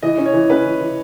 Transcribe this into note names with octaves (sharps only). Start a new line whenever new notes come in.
E3 D#5
C#4
C#5
E3
C#4 B4
E3
E3